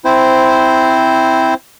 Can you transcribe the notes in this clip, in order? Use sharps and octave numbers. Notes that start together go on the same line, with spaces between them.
C4 E4 C5